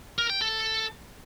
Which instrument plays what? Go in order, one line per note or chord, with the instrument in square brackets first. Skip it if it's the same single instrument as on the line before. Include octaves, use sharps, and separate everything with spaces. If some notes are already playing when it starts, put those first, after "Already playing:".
[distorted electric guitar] A#4
G5
A4